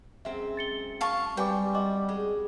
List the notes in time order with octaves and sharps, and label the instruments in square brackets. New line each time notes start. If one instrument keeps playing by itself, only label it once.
[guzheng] F#2 G#3 C4 [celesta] E5
[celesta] A6 C#7 G7
[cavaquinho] F5 A5 C#6
[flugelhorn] G3 [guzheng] C4 [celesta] B4 G#5 D6 [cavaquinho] G5
[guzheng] F#4 [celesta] D#5 D6
[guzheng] G#3